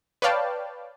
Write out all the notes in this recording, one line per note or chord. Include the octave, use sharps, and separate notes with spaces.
B4 C#5 D5 F5 G5 A5